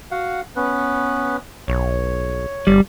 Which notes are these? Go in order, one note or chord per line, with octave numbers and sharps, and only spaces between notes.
F#4 F5 F#5
B3 C#4 B4
B1 C#5
G1 G3